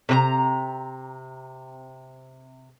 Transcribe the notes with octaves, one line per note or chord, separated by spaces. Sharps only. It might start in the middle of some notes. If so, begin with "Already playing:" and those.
C3 B4 A#5